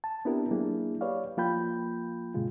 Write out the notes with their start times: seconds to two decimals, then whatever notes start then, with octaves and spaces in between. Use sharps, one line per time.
0.04 A5
0.25 B3 C4 D4 E4 G4 A#4
0.51 F#3 A#3 D4 E4 G#4
1.01 G4 B4 C#5 D5 F5
1.37 F3 A#3 F4 G5 B5 G6
2.34 G2 B2 D3 G#3 F4